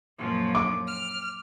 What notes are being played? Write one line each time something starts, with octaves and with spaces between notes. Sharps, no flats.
F#2 A#2 F3
D6
F6